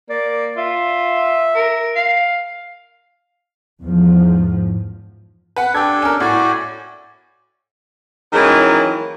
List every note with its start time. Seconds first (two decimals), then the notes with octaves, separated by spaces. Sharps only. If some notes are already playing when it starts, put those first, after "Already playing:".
0.09 A#3 D5
0.57 F4 E5
1.55 A#4
1.96 F5
3.82 E2 G#2 F3
5.56 B4 F#5
5.75 D4 G4 A4 G#6
6.02 C#4 A#4
6.20 A2 F#4 D5 G#5
8.33 D#3 E3 F#3 G#3 A#3 C#4